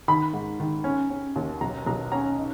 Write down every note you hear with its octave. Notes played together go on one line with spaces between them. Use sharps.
D#3 B5
G#2
D#3
C#4
C#4
D#2
B1 A#5
B1 A#5
C#4 A#5
D#4